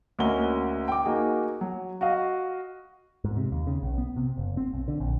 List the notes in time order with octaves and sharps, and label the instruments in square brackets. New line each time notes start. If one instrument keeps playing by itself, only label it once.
[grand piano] D2 A#3 C#4 F#4 D#5 G7
G5 D6
A#3 D#4 F#4 G#4
F#3
F#4 D#5 F5
[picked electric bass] G#2
C3
D#2
C#3
B1
B3
C3
F#1
C4
B1
D3
A#1